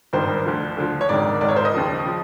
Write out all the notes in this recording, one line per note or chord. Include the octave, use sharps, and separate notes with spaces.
G#1 G2 D#3 C5
D2 D3 F3
D2 D3 F3
C#5
G#1 G#2 D#3 D5
G#1 G#2 D#3 D5
C#5
C5
D#5
D#2 C#3 F3
C#3 F3